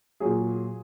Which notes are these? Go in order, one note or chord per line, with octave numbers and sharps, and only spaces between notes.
A#2 F#3 G#4